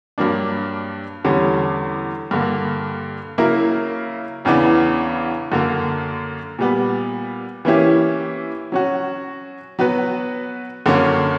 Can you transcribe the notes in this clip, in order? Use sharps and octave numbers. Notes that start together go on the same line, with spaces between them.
G2 F#3 A#3 D4
E2 D3 G3 C#4
G2 D3 A#3
C#3 F#3 A#3 E4 A#4
E2 C#3 E3 B3 D4
F#2 D3 A#3
A#2 G3 B3
E3 A#3 C#4 E4 G4
F#3 C#4 F#4
F#3 B3 F#4 B4
F#2 D3 F#3 A#3 C#4